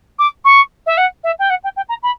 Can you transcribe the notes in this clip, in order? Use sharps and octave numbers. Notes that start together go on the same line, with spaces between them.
D6
C#6
E5
F#5
E5
G5
F#5
G5
G5
A#5
B5